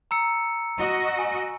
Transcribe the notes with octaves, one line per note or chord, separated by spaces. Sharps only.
A#5 E6 C#7
F#4 D#5
G#5